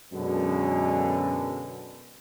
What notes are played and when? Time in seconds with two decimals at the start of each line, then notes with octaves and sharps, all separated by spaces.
0.13 F#2 B2 D3 G#3